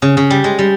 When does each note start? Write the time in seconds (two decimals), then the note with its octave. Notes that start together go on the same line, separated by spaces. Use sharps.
0.02 C#3
0.17 C#3
0.30 G3
0.44 G#3
0.59 G3